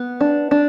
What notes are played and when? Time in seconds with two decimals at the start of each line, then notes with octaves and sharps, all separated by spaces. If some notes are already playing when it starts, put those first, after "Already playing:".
Already playing: B3
0.21 D4
0.51 D4